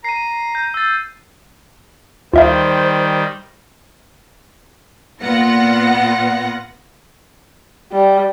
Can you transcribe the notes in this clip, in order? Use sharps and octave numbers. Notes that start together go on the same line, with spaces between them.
A#5 C7 D#7
G6
E6 A6
D2 D#3 G3 F4 C5 E5 F5
A#2 B3 F4 F#5 A#6 C#7
G3